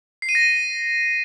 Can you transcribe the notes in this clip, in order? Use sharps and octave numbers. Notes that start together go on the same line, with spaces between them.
C7
D#7
A#6
D#7